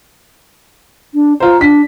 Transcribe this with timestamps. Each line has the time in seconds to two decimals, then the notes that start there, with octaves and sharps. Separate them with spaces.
1.14 D4
1.40 F4 C5 A#5
1.61 D4 B6